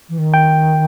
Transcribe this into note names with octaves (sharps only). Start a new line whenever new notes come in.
E3
D#3
G5